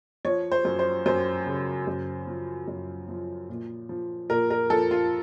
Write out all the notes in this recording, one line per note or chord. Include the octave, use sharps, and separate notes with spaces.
F3 C#5
C5
F#2
C5
F#2 C5
C#3
F#2
F3
F#2
F3
A#2
F3
A#2 A#4
A#4
F3 A4
F4